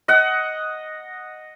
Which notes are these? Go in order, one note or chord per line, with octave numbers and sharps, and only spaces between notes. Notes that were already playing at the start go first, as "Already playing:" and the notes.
D#5 F#5